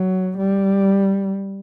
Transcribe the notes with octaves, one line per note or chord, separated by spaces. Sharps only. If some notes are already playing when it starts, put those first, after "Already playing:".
Already playing: F#3
G3